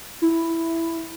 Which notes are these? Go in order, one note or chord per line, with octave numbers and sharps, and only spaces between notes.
E4